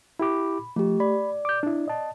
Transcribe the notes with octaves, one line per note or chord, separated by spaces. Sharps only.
E4 G4 B5 D6
F3 A3 G4
D5 B5
D6 G6
D4 E4
D#5 A5